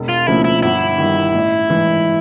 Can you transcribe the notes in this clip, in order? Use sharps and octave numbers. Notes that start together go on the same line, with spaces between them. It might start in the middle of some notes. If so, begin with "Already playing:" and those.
Already playing: E1
F4
D2 C#3 F3 A#3 E4
E4
G1 E4
G2 D#3
A1
G#2 E3